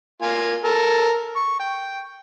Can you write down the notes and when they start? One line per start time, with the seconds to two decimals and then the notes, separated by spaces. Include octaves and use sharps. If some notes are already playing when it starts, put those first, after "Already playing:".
0.22 A#3 F4 G#5
0.64 A4 A#4
1.36 C#6
1.60 G5